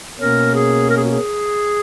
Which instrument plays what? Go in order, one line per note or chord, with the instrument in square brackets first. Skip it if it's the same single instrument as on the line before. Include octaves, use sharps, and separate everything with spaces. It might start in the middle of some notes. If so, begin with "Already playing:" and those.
[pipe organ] B2 A#3 C#4 [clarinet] A#4
[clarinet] G#4
A#4
G#4
F#4
G#4